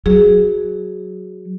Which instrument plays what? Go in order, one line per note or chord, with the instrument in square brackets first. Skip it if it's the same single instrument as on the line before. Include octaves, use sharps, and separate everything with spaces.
[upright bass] F#3 [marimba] G#4